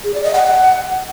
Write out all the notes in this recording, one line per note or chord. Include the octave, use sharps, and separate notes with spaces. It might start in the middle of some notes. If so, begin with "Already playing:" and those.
G#4
D5
D#5
F#5